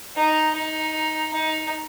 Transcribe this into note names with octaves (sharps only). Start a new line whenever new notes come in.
D#4
D#4
D#4